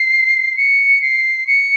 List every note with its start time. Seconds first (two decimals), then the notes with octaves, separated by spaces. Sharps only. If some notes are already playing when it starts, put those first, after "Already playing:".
Already playing: C7
0.57 C#7
1.02 C7
1.47 C#7